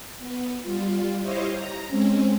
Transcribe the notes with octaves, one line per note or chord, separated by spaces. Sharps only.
B3
G3 F4
E4 G4 C5 C#5 D#5 F5
A#5
G#3 C4 C#4